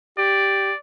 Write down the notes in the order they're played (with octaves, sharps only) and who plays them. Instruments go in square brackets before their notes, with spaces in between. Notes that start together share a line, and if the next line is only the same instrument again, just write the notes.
[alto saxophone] G4 [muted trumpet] D5